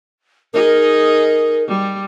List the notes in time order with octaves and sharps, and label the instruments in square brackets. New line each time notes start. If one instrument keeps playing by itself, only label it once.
[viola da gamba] D#4 G#4 D#5 [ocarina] A#4
[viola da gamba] G3